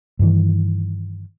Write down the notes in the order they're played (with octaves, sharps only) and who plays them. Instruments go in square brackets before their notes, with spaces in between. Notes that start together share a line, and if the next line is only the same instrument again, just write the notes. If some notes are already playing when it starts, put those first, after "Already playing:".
[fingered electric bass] G2 D#3 E3